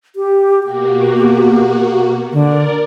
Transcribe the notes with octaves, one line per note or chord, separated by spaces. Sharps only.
G4
B2 A#3 F#4 G4
D3 A#4 D5